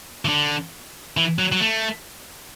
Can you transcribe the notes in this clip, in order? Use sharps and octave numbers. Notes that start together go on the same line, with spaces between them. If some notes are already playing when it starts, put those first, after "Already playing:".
E3
D3
E3
F#3
F#3
A3